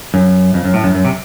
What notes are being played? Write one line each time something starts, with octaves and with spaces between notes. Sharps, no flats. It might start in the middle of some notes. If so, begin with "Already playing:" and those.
F#2
F2
F#2
A2
F#2
F#2
C3